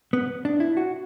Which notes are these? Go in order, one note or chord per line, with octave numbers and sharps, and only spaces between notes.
B3
D4
E4
F#4